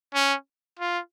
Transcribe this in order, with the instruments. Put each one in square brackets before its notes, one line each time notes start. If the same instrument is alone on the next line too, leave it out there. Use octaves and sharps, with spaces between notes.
[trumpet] C#4
F4